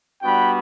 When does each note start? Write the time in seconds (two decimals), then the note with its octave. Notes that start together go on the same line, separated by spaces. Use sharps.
0.22 G3 B3 D4 F#4 G5 B5